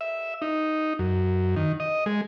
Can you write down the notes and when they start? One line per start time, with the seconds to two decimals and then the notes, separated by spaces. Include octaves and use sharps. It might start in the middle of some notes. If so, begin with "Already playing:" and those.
0.01 E5
0.42 D#4
0.99 F#2
1.57 D#3
1.80 D#5
2.06 G#3